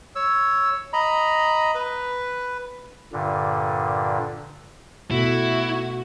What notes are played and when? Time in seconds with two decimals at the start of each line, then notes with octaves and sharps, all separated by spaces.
0.16 C#5 E6
0.93 D#5 A#5 B5
1.75 B4
3.13 G2 A#2 D3
5.11 B2 A3 E4 F#4